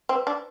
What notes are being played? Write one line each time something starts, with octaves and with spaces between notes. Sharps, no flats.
C4
B4
D4